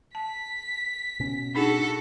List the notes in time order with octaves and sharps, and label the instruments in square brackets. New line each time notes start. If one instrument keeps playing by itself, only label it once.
[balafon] A5 [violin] B6
[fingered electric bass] B2 C#4
[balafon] D4 D#4 G#4 [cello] F#4 A4